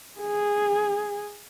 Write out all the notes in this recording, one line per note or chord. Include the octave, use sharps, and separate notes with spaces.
G#4